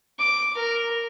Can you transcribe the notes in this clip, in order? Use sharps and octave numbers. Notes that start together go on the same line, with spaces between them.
D6
A#4